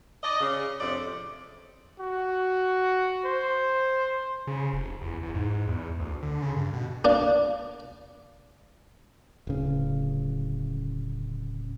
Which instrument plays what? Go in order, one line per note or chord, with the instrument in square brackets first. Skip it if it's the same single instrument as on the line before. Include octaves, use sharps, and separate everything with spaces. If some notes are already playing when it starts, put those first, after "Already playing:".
[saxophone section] D5 D#5
C#3
F2 A2 C3 D4 D5
[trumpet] F#4
C5
[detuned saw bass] C#3
F1
E2
E2
G#2
E2
D2
D3
C#3
G2
B2
[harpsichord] A#3 D4
[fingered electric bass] D1 C#3